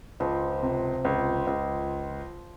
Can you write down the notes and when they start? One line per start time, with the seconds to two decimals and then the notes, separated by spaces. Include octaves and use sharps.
0.20 C#2 F3
0.62 C3
1.05 C#2
1.47 C#2